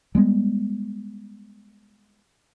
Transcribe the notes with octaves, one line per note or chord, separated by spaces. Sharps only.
G3 G#3 B3